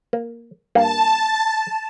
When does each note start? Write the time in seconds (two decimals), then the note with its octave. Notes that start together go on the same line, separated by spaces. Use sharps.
0.13 A#3
0.75 G2 A#3 A5